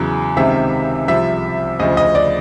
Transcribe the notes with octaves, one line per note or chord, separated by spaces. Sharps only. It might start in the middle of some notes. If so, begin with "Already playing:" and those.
Already playing: E2 C#3 F#3
C#2 C3 D#3 E5
C2 C3 F3 E5
D2 C#3 F3 D#5
D#5
D5